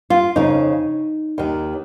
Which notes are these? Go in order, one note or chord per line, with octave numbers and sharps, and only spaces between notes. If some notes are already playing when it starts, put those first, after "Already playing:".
F4
F2 C#3 D#4
D#2 D#3